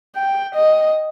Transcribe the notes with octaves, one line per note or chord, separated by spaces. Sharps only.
G5
D#5